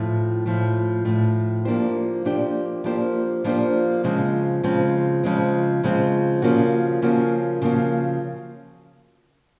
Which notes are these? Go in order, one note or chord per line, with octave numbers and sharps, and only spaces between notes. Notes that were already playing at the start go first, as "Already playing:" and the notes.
Already playing: A2 F3 A3
A2 F3 A3
A2 F3 A3
F3 A#3 D4 G4 C5
F3 A#3 D4 G4 C5
F3 A#3 D4 G4 C5
F3 A#3 D4 G4 C5
C#3 F3 G#3 C4
C#3 F3 G#3 C4
C#3 F3 G#3 C4
C#3 F3 G#3 C4
C#3 F3 A#3 C#4 F#4
C#3 F3 A#3 C#4 F#4
C#3 F3 A#3 C#4 F#4